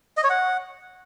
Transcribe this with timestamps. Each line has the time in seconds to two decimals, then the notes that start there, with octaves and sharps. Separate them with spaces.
0.17 D#5
0.24 C#5
0.30 F#5